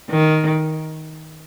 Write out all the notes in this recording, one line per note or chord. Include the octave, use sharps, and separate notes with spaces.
D#3